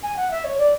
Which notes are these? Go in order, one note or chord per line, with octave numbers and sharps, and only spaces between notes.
G#5
F#5
E5
C#5
D5